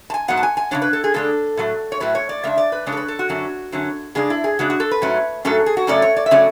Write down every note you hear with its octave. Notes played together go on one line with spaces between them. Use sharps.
A5
G#5
G#2 F#3 B3 F#5
A5
G#5
G#5
C#3 G#3 D4 C#5
B4
A4
G#4
C#3 G#3 D4 A4
A2 F#3 A3
C#5
A2 F#3 A3 B4
C#5
D5
C#3 G#3 D4 E5
D5
B4
C#3 G#3 D4 C#5
A4
B4
A4
F#4
F#2 D3 F#3 C#4
F#2 D3 F#3 C#4
C#3 G#3 D4 G#4
E4
G#4
C#3 G#3 D4 F#4
F#4
A4
B4
G#2 F#3 A3 C#4
G#2 F#3 A3 C#4 A4
G#4
F#4
F#2 C#3 F#3 A3 C#4 D5
C#5
D5
E5
C#3 F#3 A3 C#4 D5